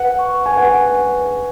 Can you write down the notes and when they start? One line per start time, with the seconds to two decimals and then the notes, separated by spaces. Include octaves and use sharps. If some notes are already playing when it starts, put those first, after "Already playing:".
Already playing: B4 F#5
0.19 C#6
0.46 G#5
0.57 B4 F#5